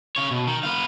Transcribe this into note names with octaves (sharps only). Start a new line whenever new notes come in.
C#3 C#5
B2
D#3
B3 F5